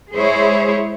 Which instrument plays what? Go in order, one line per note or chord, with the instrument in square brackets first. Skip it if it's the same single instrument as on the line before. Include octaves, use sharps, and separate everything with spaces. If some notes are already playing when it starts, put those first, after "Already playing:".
[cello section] G#3 E4 G#4 C5 C#5